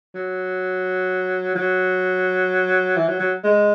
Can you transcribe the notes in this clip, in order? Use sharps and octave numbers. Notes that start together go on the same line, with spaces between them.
F#3
F#3
E3
F#3
F#3
G#3